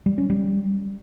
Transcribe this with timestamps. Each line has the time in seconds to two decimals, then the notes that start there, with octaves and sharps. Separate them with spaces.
0.06 G3
0.18 C#4
0.30 G3